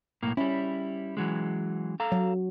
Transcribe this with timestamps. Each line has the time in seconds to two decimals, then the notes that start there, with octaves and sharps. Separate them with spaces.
0.23 B1 A2 A#3
0.37 G3 C#4 E4
1.17 E3 F#3 G#3
2.00 A4 F5 A#5
2.12 F#3